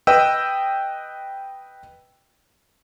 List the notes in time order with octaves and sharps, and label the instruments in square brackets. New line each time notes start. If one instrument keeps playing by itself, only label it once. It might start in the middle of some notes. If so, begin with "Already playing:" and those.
[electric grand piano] B4 D#5 G5 E6